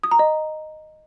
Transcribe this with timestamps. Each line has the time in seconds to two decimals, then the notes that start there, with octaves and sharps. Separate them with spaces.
0.04 D#6
0.11 A#5
0.19 D#5